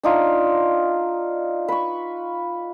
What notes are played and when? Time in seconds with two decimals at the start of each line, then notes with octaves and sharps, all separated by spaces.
0.03 D4 D#4 F4
1.68 B4 C#6